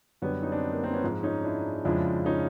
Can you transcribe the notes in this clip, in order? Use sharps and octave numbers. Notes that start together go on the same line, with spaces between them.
F#2 D3 G3 B3 C#4
C#4 D#4
C4 D4
A#3
A#3 C4
B3 C#4
G#2 F3 G#3
C#4 D#4
D4 E4
F2 C#3 F3 G#3 D4 E4
C#4 D#4